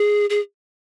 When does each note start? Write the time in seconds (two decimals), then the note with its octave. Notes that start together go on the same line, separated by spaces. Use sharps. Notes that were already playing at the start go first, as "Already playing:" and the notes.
Already playing: G#4
0.30 G#4